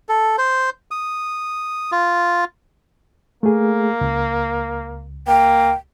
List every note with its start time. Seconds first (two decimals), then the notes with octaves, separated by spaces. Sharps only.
0.09 A4
0.38 C5
0.91 D#6
1.92 F4
3.43 A3 A#3 G#4
4.01 C#2
5.28 A#3 G5